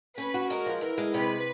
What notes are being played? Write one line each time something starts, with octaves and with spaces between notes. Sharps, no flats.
C#4 B4
F#4
G#3 A#4
F3
E3 A#4
G#3
C3 B4